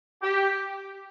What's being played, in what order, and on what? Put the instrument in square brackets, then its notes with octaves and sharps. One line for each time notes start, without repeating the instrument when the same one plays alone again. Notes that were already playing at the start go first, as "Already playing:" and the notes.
[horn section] G4